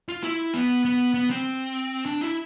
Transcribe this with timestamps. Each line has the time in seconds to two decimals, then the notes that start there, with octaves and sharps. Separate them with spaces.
0.09 F4
0.23 E4
0.54 B3
0.85 B3
1.14 B3
1.30 C4
2.06 D4
2.21 E4